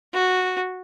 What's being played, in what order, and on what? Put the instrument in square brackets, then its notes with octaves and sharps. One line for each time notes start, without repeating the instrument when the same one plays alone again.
[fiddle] F#4